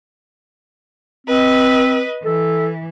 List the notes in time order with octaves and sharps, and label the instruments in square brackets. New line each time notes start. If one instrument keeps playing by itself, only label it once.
[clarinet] C4 [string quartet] B4 D#5
[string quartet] E3 [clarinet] A4